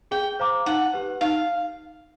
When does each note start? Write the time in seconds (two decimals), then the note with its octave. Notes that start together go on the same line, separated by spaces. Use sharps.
0.11 G#4 G5
0.40 C5 F5 A#5 D6
0.66 D#4 F#5
0.94 G4 B4
1.21 D#4 F5